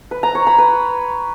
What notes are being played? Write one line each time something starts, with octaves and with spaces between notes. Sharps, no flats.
B4
A#5
C#5
B5
B4